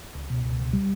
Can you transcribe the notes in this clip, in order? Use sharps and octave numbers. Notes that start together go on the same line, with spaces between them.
C#2
B2
C#2
C#2
G3